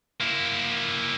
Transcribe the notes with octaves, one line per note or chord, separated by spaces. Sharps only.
A#3 E4